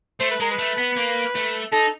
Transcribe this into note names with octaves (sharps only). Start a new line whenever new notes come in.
A3 C5
B4
G#3 A#4
B4
A3
B3
A#3
A3
D#4 A4